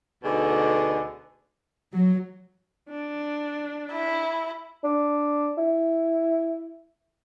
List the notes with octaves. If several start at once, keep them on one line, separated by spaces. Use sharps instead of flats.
D2 B2 D3 D#4 G#4
F#3
D4
E4
D4
E4